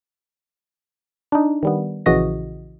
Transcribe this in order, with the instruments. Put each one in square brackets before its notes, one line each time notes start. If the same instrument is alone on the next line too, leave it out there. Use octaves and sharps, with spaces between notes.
[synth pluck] D4 D#4
D#3 G3 B3
A#1 C#3 E3 F#4 D#5 A#6